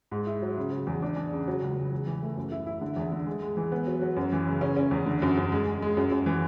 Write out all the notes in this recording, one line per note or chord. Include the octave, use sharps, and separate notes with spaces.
G#2
E4
F#3
C#3
F#3
E2
D4
D4
C#3
F#3
C#2
C#2
E2
E3
A3
F#2
E4
E4
D3
E2
D3
G#3
G#3
E3
B3
F#3
F#3
F#2
E3
C#3
C#4
C#4
E2
D3
F#2
F#2
G#3
G#3
G#3
F#2
F#2
E3